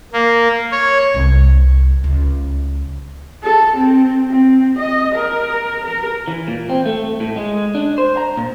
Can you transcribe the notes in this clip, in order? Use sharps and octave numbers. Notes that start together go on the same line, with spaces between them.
A#3
C#5
C2
C#2
A4
C4
C4
D#5
A#4
A#4
E3
A#2
C4
A3
A2
G#3
D4
C5
A#5
A#2